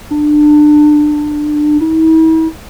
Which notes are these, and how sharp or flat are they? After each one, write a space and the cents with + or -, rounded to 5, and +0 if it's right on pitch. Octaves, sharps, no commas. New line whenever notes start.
D4 +25
E4 -45